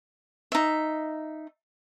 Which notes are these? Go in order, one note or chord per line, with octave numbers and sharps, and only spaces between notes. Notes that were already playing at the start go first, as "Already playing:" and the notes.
D#4 E5